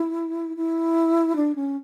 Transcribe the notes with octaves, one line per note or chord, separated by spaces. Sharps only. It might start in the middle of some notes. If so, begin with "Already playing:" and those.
Already playing: E4
E4
D4
C#4